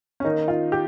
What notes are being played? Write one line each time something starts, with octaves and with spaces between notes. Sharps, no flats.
C#4
D#3 A#3 D#4
F4
G4